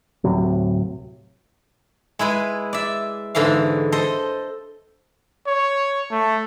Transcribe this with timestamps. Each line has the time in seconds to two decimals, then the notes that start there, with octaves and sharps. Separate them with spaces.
0.24 D1 A2 C3 F#3
2.19 G#3 E4 G#4 B4
2.73 D5 E5
3.35 G#2 D3 E3 E5 F5
3.92 A4 C5 D#5
5.47 C#5
6.11 A3